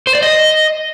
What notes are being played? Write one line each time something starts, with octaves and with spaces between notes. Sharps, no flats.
C5
D5
D#5